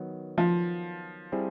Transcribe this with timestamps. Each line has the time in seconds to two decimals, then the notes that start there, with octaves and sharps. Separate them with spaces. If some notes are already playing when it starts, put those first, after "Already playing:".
Already playing: D#3 F#3 B3
0.38 F3
1.32 G3 C4 E4 G#4 C5